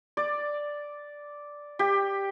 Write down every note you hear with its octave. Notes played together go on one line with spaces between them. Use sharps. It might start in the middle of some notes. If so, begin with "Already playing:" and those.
D5
G4